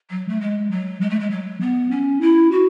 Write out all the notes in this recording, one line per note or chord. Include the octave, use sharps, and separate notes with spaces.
F#3
A3
G#3
F#3
G#3
A3
G#3
F#3
B3
C#4
E4
F#4